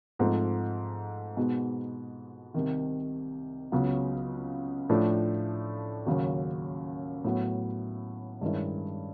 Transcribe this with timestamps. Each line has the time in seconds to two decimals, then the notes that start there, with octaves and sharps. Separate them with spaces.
0.19 G#2 F3 A3 C4
1.37 B2 G#3 B3 D#4
2.54 C2 C3 D#3
3.72 C#2 C#3 F#3 B3
4.89 A2 F3 A3 D4
6.06 D#2 C#3 F#3
7.24 A2 F#3 B3
8.41 G2 D#3 G#3 C#4 E4